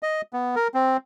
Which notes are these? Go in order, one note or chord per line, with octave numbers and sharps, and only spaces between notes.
D#5
B3
A#4
C4